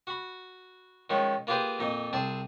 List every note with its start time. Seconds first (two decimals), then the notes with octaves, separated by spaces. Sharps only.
0.07 F#4 B5
1.10 D#3 F3 G#3 C#4
1.47 A#3 F4 G4 G#4 B4 C5
1.79 F2 A#2 D#4
2.13 C2 C4 G#4 A5